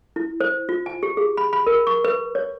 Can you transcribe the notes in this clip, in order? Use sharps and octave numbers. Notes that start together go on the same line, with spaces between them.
E4
C5
F4
G#5
G4
G#4
B5
B5
A#4
C#6
B4
C#5